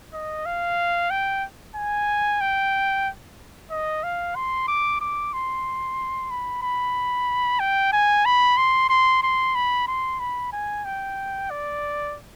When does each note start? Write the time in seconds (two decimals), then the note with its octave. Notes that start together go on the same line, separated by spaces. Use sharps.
0.13 D#5
0.46 F5
1.11 G5
1.76 G#5
2.41 G5
3.71 D#5
4.03 F5
4.36 C6
4.68 D6
5.01 D6
5.33 C6
6.31 B5
6.63 B5
7.60 G5
7.93 G#5
8.26 B5
8.57 C6
8.90 C6
9.23 C6
9.55 B5
9.88 C6
10.20 B5
10.53 G#5
10.85 G5
11.50 D5